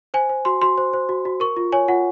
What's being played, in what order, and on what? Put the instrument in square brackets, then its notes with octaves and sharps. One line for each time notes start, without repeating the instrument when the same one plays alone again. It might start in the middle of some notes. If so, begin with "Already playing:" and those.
[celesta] C5 G#5
C5
F#4 C6
F#4 C6
C5
C5
F#4
F#4
A#4 C#6
F4
C#5 G#5
F4 F#5